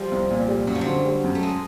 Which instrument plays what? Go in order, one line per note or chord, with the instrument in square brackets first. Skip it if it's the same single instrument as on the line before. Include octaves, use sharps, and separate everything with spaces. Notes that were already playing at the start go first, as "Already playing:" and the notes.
Already playing: [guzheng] F3 [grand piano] G3
[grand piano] C2
A#2
G3
[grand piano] F#2 [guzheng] F#3
[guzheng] F3
F#3
[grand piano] D3
G3
F#2
[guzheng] A3
G#3